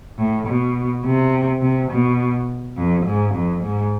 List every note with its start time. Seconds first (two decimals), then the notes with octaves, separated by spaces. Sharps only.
0.18 A2
0.47 B2
1.05 C3
1.62 C3
1.90 B2
2.77 F2
3.05 G#2
3.34 F2
3.62 G#2